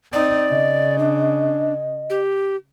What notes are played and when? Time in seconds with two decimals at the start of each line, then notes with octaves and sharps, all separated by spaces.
0.13 C4 D#4 D5
0.48 C#3 D#5
0.98 D4
2.10 G4